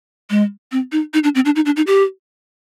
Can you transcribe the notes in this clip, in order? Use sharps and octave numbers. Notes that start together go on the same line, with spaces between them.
G#3
C4
D#4
D#4
D4
C4
D4
D#4
D4
D#4
G4